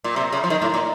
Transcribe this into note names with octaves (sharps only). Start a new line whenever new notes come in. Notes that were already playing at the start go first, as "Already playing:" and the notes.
A#2
C3
C#3
F3
D#3
A2
A#2